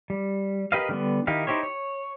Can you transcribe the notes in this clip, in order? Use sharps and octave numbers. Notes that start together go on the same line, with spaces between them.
G3
G4 A#4 B4 D#5 F5
D3 G3 B3
D#3 D#4 E4 G4 F5
D#4 E4 G4 C5 C#5
C#5